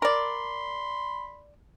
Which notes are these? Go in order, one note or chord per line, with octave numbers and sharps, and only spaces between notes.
A#4 D5 B5 C6